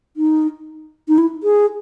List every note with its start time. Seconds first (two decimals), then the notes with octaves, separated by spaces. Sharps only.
0.17 D#4
1.08 D#4
1.18 E4
1.43 G#4